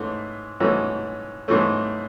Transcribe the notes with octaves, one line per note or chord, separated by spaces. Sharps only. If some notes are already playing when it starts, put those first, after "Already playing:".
Already playing: G#2 E3 A3 C#4
G#2 E3 A3 C#4
G#2 E3 A3 C#4